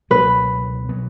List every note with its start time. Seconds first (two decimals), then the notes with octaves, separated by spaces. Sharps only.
0.10 C#2 B2 F#3 B3 B4
0.89 B2 F#3 B3